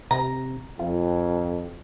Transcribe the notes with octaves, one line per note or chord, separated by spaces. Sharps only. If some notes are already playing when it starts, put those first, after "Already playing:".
C3 A#5
F2 F4